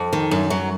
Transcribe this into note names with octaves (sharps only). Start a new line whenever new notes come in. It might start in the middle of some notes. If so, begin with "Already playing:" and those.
Already playing: F2
D#3
F#2
F#3